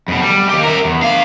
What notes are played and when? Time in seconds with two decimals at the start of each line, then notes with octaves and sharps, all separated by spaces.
0.08 F2 B2
0.22 G3
0.49 D#2 G4
0.63 A#4 E5
0.85 E2
1.02 D4 F5